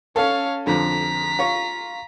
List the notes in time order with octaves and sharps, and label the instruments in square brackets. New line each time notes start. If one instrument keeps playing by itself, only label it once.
[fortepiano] C#4 A4 [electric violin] C#5 F5
[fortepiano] F2 D3 F3 [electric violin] A#5 B6
[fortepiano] F4 C#5